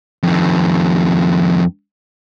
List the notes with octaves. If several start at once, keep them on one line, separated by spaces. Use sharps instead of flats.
F2 D#3